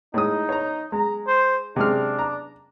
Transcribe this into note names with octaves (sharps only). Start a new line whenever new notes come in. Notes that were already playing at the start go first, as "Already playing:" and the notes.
A2 G#3 D#4 D#6
C#5 A#5
G#3 A#5
C5
C3 G#3 D4 F6
A#5